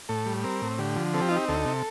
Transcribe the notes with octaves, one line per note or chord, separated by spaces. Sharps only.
A2 A4
G3
C4 A#4
A2
D3 G4
F3
C4 A4
G4
D#4 F4
G4
D2 A4
C3